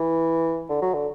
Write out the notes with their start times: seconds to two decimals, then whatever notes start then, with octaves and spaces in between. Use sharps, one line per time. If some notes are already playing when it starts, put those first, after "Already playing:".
Already playing: E3
0.69 D3
0.82 F#3
0.94 D3